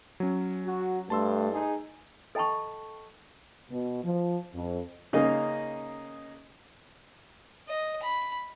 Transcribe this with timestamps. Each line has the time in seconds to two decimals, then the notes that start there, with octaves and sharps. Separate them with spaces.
0.20 F#3 C#4
0.66 F#4
1.10 G2 A3 A5 C6 E6
1.52 D#4 G#4
2.35 A4 D#5 G5 A5 B5 C#6
3.70 B2
4.03 F3
4.53 F2
5.13 C#3 A#3 D#4
7.68 D#5
8.02 B5